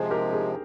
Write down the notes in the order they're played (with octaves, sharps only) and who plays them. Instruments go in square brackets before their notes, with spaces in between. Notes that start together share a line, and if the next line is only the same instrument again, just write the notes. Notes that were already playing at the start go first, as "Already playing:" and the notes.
Already playing: [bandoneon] C3 F3 G#3 [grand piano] G#4 C5
[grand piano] G4 A#4
G#4